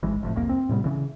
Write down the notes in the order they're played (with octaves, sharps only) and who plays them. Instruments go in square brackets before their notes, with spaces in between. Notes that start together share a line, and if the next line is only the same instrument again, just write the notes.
[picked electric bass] G#1 E3 G#3
F1 F2 A2
C2 F2 A#3
C4
A2 C3 G3 B3
C#3 E3